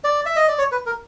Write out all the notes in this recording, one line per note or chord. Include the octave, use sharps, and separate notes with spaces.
D5
E5
D#5
D5
C#5
B4
A#4